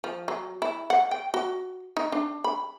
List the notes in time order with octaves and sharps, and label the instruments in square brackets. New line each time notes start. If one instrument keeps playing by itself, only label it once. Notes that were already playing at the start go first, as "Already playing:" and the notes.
[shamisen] F3
F#3
E4
F#5
G5
F#4
D#4
D4
B5